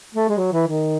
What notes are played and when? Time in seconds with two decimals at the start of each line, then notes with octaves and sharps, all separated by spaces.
0.14 A3
0.29 G#3
0.37 F#3
0.52 E3
0.67 D#3